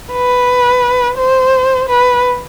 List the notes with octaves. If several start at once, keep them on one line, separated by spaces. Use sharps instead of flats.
B4
C5
B4